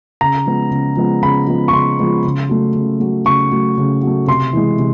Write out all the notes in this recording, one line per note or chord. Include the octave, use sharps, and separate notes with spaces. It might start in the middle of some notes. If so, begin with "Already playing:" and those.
C#3 A#5
F3 G#3 B3
C#3
F3 G#3 B3
C#3 B5
F3 G#3 B3
C#6
C#3 C6
F3 G#3 B3
C#3
F#3 A3
C#3
F#3 A3
C#3 C#6
F#3 A3
C#3
F#3 A3
C3 C6
E3 G#3
C3